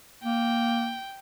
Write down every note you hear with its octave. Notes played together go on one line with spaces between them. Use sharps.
A#3 G5